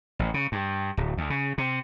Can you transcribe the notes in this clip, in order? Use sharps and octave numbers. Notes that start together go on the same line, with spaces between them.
A1
C#3
G2
D1
D2
C#3
C3